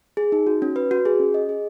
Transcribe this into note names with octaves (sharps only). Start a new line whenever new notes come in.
G#4
D#4
F#4
C#4
B4
F#4
G#4
C#4
D#5
G#4